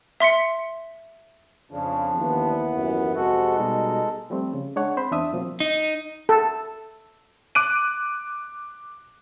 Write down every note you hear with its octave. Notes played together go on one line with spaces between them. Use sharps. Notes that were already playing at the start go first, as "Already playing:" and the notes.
E5 C6 B6 C#7
F2 C#3 F3 D4
D#2 E3 B3
F#2
F2 C3 G#3 F#4 A4
B2 G3 D#4
F3 G3 A3 C4
C#3
G#3 D4 C#5 F#5
C4 C5 B5
E2 D4 E5 D#6
B2 F3 F#3 A#3 C4
D#4
A4
D6 F#6 D7 D#7